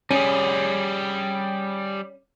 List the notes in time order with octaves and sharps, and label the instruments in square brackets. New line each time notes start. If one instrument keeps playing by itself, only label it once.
[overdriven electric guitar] G3 G#4 [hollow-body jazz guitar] C#4